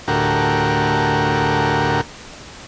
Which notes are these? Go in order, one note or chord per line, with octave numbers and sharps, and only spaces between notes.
D2 A2 F#4 G4 A#4